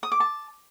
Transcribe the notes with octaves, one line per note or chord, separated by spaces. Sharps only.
D#6
D6
A5